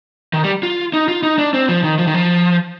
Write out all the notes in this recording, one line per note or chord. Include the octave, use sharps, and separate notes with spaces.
D#3
G3
F4
D#4
F4
D#4
D4
C4
F3
D#3
F3
D#3
F3